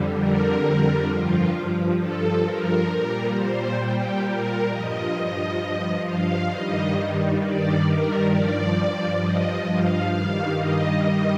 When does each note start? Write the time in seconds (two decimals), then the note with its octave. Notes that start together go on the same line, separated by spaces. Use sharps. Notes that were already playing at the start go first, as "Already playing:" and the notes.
Already playing: F2 D3 G3
0.16 A#4
1.07 G2 F3 F4
1.97 A4
2.43 A#4
2.87 A#2 G3
3.32 C5
3.78 G4
4.24 A#4
4.68 G2 F3 D#5
6.04 F5
6.49 G2 D#3 G3 D#5
7.39 D5
7.84 A#4
8.30 G2 F3 D5
9.20 D#5
9.66 F5
10.11 G2 D#3 G3 F5
10.56 D#5
11.01 D#5